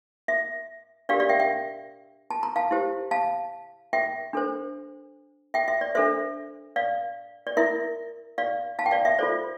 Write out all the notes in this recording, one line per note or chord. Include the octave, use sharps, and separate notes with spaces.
E5
D4 G4 A#4 D5 F5
D5 F5
E5 G5
E5 G5
A5
A#5
F5 A5
E4 G4 C5
F5 A5
E5 G5
D4 A4 C5
E5 G5
E5
D5
D4 A4 C5 E5
D5 F5
D5
E4 A#4 E5
D5 F5
F5 A5
G5
D5 F5
E5
F4 A4 C5 D5